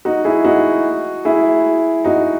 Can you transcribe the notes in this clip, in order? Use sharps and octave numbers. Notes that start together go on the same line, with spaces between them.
D#4 F#4
E4 G#4
D#4 F#4
E4 G#4
D#4 F#4